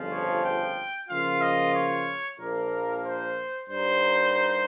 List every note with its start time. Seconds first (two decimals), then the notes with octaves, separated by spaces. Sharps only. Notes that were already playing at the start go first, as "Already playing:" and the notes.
Already playing: G1 F2 C#3 F3
0.12 C#5
0.45 G5
1.09 C#3 F3 A#3 F4 F5
1.42 D#5
1.75 C#5
2.39 A#1 A#2 F3 A#3 A#4
3.04 C5
3.69 G2 G3 A#3 D#4 C5